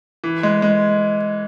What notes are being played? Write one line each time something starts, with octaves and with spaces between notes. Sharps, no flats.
E3
G#3
G#3